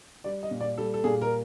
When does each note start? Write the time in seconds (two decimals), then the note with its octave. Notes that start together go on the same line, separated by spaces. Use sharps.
0.24 G3 D5
0.43 D#5
0.51 A#2
0.61 D5
0.78 G3 A4
0.94 A4
1.04 A#2 G#4
1.21 A#4